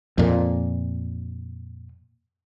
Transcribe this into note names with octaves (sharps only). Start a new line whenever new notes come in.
F2 A#2